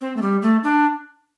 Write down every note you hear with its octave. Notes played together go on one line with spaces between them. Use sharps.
C4
A3
G3
A3
D4